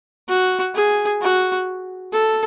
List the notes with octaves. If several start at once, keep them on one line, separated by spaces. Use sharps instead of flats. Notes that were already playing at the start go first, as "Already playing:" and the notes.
F#4
G#4
F#4
A4